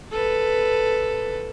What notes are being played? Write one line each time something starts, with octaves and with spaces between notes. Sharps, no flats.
A4 B4